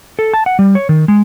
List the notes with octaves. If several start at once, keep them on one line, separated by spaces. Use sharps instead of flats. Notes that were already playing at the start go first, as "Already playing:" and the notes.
A4
A5
F#5
G3
C#5
D#3
G#3